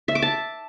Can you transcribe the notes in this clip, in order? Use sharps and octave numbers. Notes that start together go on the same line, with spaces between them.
E5
D6
A5